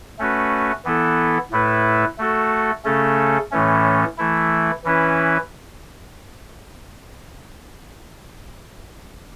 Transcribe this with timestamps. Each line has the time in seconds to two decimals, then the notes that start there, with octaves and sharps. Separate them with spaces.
0.19 A3 C#4 F#4 B4
0.85 E3 B3 E4 A4
1.51 A2 A3 E4 B4
2.19 A3 F#4 A4
2.85 C#3 A3 C#4 A4
3.52 A2 E3 A3 C#4
4.18 E3 A3 E4
4.84 E3 C#4 E4 B4